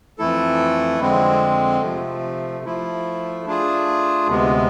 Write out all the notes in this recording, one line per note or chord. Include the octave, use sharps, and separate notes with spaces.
F2 E3 A3 E4 A4
F2 D3 G#3 C4
C3 F3 A3
F3 A3 E4
A3 D4 F4 G#4
D2 C3 G#3 B3